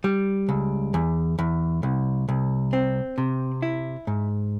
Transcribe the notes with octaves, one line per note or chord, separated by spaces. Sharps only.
G3
C#2
E2
E2
C2
C2
C4
C3
E4
G#2